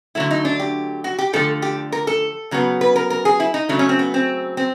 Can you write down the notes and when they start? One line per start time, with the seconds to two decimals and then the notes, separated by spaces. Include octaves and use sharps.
0.15 D3 F#3 A3 E4
0.31 D#4
0.45 D4
0.60 G4
1.04 F#4
1.18 G4
1.33 D3 F3 A3 A4
1.62 G4
1.92 A#4
2.07 A4
2.51 C#3 F#3 B3
2.81 B4
2.96 A#4
3.10 A#4
3.25 G#4
3.40 E4
3.54 D#4
3.69 C#3 F#3 A3 D4
3.79 C#4
3.89 C4
3.99 B3
4.14 C4
4.57 C4